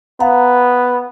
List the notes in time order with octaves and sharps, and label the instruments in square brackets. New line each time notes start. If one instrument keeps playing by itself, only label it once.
[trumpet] B3 [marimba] F5 F#5 A#5